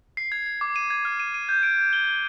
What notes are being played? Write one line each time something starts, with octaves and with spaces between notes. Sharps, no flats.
C7
G#6
G#6
D6
D#7
G#6
F6
D#7
D#7
G6
D7
G6
G7
G7